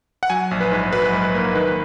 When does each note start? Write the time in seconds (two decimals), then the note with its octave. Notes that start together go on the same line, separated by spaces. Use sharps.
0.23 F#5
0.30 F#3 G#5
0.51 A#1
0.60 B4
0.72 G#2
0.92 F#3 B4
1.13 G#2
1.23 B4
1.35 A#3
1.55 D#3 B4